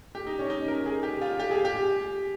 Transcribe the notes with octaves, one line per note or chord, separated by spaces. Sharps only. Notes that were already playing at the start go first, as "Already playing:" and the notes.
G4
D#4
C#4
D#4
A#4
G#4
G4
F4
G4
G#4
G4